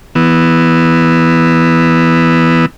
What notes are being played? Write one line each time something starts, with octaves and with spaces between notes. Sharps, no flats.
E3 B3